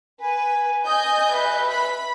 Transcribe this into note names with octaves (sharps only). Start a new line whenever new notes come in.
B4 G#5
D#5 G#5 D#6 G6
B4 E5
B5